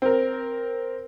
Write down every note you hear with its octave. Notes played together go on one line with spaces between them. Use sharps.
C4 A#4